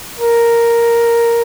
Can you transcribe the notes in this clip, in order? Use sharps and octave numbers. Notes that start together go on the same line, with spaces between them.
A#4